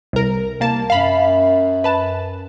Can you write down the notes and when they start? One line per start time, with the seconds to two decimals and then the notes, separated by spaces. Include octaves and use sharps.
0.13 C2 A#4
0.60 C2 A#3 A5
0.90 F#2 F5 B5
1.84 B4 A5